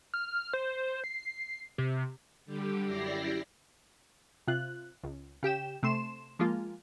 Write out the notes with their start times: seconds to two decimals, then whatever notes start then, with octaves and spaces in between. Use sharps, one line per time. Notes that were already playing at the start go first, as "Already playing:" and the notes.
0.14 F6
0.53 C5
1.04 C7
1.78 C3
2.46 D3 G3 G4
2.86 F#2 E4 G4 D5 A#6 C7
4.48 C3 F4 F#6
5.04 C#2
5.43 C#3 G4 G5 E7
5.83 C3 A3 C6 E7
6.39 F3 G#3 A#3 F4